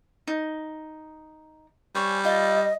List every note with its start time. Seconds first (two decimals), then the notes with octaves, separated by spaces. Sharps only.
0.27 D#4
1.95 G3 C5 C#5 G#5
2.25 F4 D#5